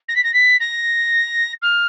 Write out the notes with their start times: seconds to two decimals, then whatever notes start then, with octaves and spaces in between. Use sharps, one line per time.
0.08 A#6
0.15 B6
0.24 A#6
0.33 B6
0.60 A#6
1.62 F6